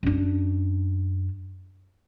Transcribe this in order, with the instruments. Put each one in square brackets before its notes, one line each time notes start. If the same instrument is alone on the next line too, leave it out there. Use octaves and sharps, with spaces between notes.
[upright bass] F#2 D4